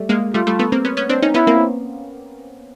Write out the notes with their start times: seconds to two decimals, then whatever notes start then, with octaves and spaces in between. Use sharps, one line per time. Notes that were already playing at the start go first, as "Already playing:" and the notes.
Already playing: G3 A3
0.09 G#3 A#3
0.34 G3 A3 F4
0.47 G3 A3
0.59 A3 B3
0.72 A#3 C4
0.85 B3 C#4
0.97 B3 C#4
1.09 C4 D4
1.22 C#4 D#4
1.34 B3 C#4 E4
1.47 A#3 C4